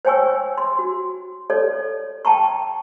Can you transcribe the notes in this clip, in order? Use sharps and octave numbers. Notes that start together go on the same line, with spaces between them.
C5 C#5 G5 G#5 C#6 E6
C6
F#4
A4 C#5 D5
G5 A5 A#5 C#6